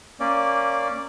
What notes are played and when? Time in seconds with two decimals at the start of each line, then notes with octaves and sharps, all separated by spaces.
0.20 A#3 C#4 D5